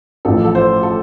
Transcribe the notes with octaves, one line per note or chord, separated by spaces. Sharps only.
A1 A2 F3 A4
A4
C5
A4